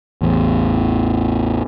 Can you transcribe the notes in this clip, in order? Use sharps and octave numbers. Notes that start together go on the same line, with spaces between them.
A1 E2